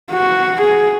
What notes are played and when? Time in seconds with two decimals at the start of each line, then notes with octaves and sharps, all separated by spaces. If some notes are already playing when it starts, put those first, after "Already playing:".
0.11 F#4
0.62 G#4